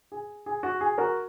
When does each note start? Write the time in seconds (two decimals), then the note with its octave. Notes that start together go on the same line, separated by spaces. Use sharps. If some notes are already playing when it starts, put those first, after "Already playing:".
0.12 G#4
0.46 G#4
0.63 F#4
0.81 G#4
0.98 F#4 A#4